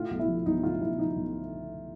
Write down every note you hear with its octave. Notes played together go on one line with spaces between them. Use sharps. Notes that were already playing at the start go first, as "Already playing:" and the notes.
Already playing: A2 F4
B1
E4
F3
B1 D#4
A2 F4
B1 E4
F3 D#4
B1